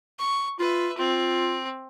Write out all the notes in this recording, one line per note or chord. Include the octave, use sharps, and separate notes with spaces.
C#6
F4 B4 E5
C4 F4